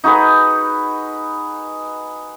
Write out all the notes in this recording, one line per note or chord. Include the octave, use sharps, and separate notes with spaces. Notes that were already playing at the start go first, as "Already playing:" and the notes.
D#4 F#4 G#4 B4